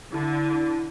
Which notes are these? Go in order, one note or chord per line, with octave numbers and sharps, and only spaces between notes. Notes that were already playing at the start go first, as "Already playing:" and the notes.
D3 E4